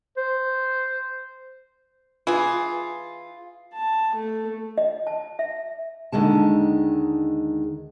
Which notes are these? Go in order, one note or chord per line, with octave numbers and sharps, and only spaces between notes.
C5
E3 F4 G#4
A5
A3
D#5
A5
E5
D#2 D3 D#3 G#3 A5